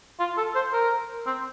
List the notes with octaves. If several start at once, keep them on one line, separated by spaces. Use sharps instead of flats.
F4
A4
C5
A#4
C4